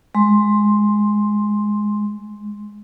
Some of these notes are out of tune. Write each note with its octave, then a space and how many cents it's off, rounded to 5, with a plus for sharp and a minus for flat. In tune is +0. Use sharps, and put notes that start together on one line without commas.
G#3 +0 C6 +5